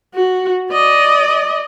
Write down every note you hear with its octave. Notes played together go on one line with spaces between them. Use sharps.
F#4
D5 D#5